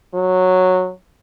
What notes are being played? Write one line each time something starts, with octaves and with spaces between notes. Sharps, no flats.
F#3